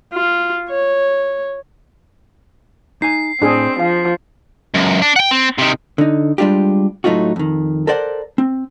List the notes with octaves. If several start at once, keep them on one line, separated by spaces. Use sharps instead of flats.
F4
C#5
D#4 G#5 C7
A2 C4 D4 G#4
F3 F5
C#2 F#2
D4
F#5 G5
C4
C3 D#3
D3 D#4
G3 G#3 D4 F4 G4
A2 F#3 A3 D#4 F4 F#4
F2 D#3
A4 A#4 C5 D5 F#5
C4